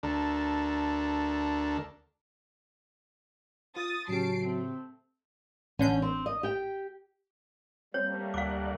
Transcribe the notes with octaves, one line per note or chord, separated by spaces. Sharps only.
D2 D4 A4 A#4
F4 D#6 A6
A2 C#3 F#3 C#4 G4 A5 C7 D7
A3 C4
A1 D3 C#4 G6
C4
D#5
G4 G5
G3 A3 A#3 C4 C#5
D2 D5 F5 F#5 D6